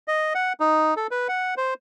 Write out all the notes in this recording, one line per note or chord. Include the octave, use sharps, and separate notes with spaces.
D#5
F#5
D#4
A4
B4
F#5
C5